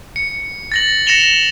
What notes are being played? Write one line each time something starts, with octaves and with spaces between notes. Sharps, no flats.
C#7
A6 A#6 F#7
A#6 C#7 E7 F7 G7